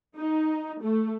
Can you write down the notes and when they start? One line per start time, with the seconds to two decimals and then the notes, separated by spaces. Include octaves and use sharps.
0.17 D#4
0.83 A3